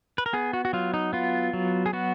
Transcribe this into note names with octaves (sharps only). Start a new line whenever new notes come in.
B4
A#4
B3 G#4
F#4
F#4
F#3 F4
D#4
B3 F4
F#3
G#4
B3 F#4